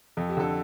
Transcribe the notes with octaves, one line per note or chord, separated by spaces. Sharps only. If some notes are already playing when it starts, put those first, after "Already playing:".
F2 A4
G4
D3 A4